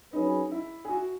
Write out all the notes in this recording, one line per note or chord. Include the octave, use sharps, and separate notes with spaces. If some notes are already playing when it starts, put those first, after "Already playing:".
F#3 C#4 D#4 G#4 B4
E4
G#4
F#4